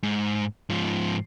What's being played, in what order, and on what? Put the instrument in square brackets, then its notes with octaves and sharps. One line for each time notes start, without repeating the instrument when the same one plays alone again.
[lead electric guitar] G#2
G#2 F3